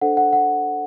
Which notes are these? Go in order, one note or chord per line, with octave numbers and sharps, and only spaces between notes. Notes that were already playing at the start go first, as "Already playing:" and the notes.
D4 A4 C5 F#5
F#5
F#5